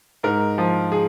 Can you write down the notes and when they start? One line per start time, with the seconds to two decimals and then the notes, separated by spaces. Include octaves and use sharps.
0.23 G#2 A#4
0.58 F3
0.92 G#4